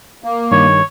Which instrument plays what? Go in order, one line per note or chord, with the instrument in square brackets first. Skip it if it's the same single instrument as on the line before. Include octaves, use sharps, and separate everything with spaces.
[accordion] A#3
[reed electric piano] G2 D#3 G#6 [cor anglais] C#5